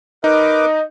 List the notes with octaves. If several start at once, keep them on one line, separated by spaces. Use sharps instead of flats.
D#4 A#4 B4 D#5 D6